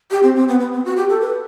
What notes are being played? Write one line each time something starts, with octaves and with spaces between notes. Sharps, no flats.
G4
C4
C4
B3
B3
C4
F#4
G4
A4
B4